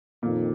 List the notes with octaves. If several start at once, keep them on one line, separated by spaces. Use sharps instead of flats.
F2 A#2 D#3